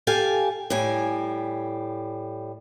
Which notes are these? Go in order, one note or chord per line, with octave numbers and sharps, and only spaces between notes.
G4 A4 F5 G#5 A5
A2 G3 G#5